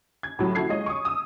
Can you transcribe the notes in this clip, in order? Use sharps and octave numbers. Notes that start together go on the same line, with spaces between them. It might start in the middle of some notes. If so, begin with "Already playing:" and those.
G#6
A2 F#3 G3
A#1 E4 F#4 A4 G#6 C7
G#3 F4 C#5 D#5
C#6 D#6
D#6 E6